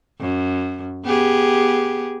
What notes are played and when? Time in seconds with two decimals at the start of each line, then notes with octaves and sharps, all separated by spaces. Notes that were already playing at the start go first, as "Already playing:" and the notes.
0.20 F#2
1.04 B3 G4 G#4